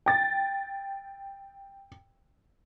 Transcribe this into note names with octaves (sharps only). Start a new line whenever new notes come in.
G5 A6